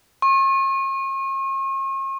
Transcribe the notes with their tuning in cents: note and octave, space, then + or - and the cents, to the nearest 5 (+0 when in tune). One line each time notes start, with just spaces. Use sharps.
C#6 -45